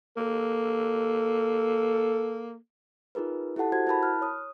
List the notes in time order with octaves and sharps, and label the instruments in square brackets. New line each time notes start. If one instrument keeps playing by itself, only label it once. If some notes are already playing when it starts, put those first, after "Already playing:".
[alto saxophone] A#3 [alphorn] A4
[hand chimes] D#4 F4 G#4 A#4 B4
E4 G4 A4 F#5 A5
F#4 C5 F#5 G#6
E4 A#4 A5 B5
F6 F#6
C#5 D#6